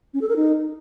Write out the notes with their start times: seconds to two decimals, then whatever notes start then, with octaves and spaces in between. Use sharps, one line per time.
0.14 C#4
0.21 A4
0.29 A#4
0.36 D#4